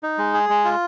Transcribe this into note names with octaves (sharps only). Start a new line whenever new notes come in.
D#4
G#3
G#4
G#3
F4